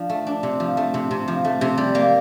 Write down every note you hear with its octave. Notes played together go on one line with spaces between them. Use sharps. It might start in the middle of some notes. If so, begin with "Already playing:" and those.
Already playing: F3 D4
A3
D4
C3
F3
A3
C3
C3
F3
A3
C3
G3
A#3